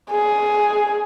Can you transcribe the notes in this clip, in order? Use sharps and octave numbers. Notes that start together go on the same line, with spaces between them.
G#4